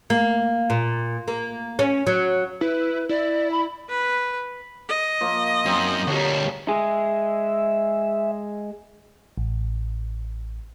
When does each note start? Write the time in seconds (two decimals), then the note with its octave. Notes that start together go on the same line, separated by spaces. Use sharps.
0.10 A#3
0.70 A#2
1.28 A#3
1.79 C#4
2.07 F#3
2.61 E4 B4
3.09 E4 D5
3.52 B5
3.89 B4
4.89 D#5
5.21 F3 A#3
5.66 F#2 C4 D#4
6.07 D2 G3 F#4 C#5
6.68 G#3 G#4 E5
9.38 A1